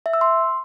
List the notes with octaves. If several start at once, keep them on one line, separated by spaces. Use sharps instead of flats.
E5
E6
C6